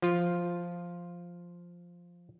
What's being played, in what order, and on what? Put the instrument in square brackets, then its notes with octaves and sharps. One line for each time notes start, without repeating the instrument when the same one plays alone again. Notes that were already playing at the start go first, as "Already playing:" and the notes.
[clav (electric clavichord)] F3 F4